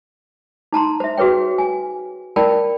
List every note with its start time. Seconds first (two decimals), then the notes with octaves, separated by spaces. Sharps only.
0.73 D#4 A5 A#5 C6
1.00 C5 E5
1.17 F#4 G#4 B4 C#5 G5
1.58 G#5
2.36 A#4 D5 G5 A5 B5